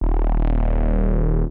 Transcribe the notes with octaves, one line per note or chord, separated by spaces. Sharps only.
D#1